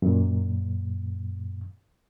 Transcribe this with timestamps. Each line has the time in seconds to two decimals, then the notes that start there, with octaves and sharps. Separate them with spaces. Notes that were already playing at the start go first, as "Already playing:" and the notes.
0.02 F#2 A#2